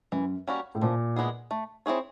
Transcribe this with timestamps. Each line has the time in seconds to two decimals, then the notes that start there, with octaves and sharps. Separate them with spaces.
0.12 F#2 E3
0.47 G3 A#3 C#4 F#4
0.75 A2
0.82 A#2 F3
1.16 G#3 B3 E4 G#4
1.51 A3
1.86 C4 E4 G#4 C#5